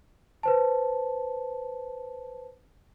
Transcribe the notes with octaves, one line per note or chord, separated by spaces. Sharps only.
B4 C5 A5